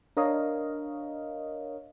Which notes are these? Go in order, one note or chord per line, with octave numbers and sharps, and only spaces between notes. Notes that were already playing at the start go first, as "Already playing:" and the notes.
D4 A#4 C#5 D#5 F5